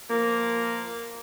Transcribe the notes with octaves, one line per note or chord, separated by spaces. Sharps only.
F3 A#3